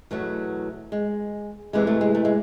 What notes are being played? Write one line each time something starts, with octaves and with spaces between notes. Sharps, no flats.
E2 B2 F#3 A3
G#3
E2 C3 E3 G#3
A3
G#3
A3
G#3